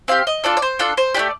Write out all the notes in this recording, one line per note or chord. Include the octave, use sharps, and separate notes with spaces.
C4 G4 F5
D#5
D4 F4 A4 D5
D5
C5
D4 F4 A4
C5
A3 D4 G4 D5